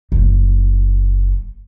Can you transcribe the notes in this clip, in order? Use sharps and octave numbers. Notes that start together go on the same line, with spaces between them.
F#1 D#4